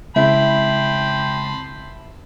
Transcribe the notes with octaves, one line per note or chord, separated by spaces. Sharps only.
C#3 G#3 C4 E4 G5 A5 B5 C6